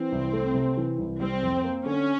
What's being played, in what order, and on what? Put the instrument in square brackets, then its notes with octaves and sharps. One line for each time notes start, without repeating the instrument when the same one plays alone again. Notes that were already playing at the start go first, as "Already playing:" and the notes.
Already playing: [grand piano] E3 [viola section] C4
[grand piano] C2
A3
C3
E3
C2
[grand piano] G3 [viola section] C4
[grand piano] F2
A#3
[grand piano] D3 [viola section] C#4